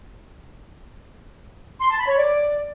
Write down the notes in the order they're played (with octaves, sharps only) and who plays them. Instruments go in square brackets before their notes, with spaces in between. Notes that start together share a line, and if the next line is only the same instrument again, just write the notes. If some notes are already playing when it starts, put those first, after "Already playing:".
[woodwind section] C6
A5
B5
C#5
D5